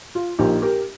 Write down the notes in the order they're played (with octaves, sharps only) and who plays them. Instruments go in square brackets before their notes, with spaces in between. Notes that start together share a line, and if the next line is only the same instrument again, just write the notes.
[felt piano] F4
A#1 A#2 D#4 G4
G4 A#4